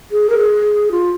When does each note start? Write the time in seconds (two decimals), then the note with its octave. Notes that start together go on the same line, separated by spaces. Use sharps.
0.11 G#4
0.30 A#4
0.38 G#4
0.91 F4